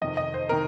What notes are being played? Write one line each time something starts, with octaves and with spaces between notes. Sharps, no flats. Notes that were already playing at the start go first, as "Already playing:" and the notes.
F2 C3 D#3 D#5
D#5
C5
C3 D#3 A#4